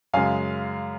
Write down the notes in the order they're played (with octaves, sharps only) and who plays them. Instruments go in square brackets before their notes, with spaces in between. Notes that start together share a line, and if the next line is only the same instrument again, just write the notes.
[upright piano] F#2 C#3 G#3 F5 G#5